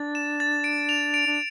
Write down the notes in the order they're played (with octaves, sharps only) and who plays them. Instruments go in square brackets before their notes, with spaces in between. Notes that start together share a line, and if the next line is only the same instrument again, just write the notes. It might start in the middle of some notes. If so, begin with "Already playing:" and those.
Already playing: [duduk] D4 [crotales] A6
[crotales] E7
A6
D7
F7
D7
[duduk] D4